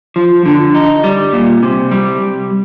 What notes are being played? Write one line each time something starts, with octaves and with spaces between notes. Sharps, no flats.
F3
D3
D#4
G3
A#2
C3
G3